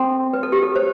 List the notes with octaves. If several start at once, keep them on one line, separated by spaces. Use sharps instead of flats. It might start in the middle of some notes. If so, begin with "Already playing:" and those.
Already playing: C4 A4
B4
A4
G4
A4
C5